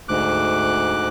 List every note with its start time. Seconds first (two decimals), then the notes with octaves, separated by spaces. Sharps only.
0.09 D2 G#2 D6 F#6